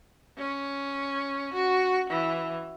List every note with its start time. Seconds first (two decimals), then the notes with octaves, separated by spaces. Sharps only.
0.38 C#4
1.54 F#4
2.10 E3